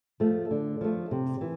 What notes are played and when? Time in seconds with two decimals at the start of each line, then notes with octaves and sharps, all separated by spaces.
0.20 F3 A3
0.51 D3
0.81 F3 A3
1.11 C3
1.41 E3